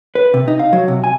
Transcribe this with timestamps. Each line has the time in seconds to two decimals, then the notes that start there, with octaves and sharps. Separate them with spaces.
0.15 B4
0.34 C3
0.48 D#4
0.59 F5
0.73 F#3
0.88 C3
1.04 G#5